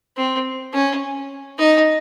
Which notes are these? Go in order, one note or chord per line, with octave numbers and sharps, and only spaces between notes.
C4
C#4
D#4